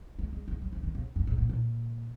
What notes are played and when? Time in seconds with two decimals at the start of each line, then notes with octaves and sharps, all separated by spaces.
0.19 G#3
0.33 G#3
0.48 G#3
0.62 G3
0.73 F3
0.83 D#3
0.95 C#3
1.16 G2
1.27 G#2
1.38 A#2
1.49 A#2